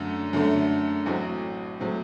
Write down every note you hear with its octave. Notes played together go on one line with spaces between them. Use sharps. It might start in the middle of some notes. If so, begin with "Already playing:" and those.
Already playing: F#2 D3 A3
F#2 D3 A3
A1 A2 F#3 C4
A2 F#3 C4